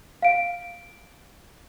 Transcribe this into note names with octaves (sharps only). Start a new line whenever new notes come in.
F5 D7